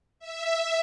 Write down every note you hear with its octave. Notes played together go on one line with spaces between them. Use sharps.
E5